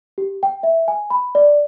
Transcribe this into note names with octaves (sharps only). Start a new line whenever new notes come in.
G4
G5
E5
G#5
B5
D5